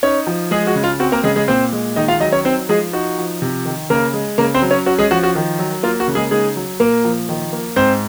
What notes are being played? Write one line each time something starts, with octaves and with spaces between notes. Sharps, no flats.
C#4 D#4 C#5
F3
G#3 G#4
F#4
C#3
F4
C4 F#4
A#3 A#4
C#3 G#3 G#4
G#3 G#4
A#2 C4 C5
G#3
D#3 D#4 D#5
F4 F5
F#3 D#4 D#5
C#4 C#5
C4 D#4 C5
F3 G#3 G#4
D#4 F#4
F3
C3
D#3
C#3 A#3 A#4
G#3
C#3 A#3 A#4
C4 C5
F#3
C#4 C#5
C#4 F#4
G#3 G#4
F3 F#4
F#4
D#3
F#3
A#3 F4
F#4
C#3
G#3 G#4
G#3 D#4 G#4
F#3
A#2 A#3 A#4
F3
D#3
A#3
G#2 C4 C5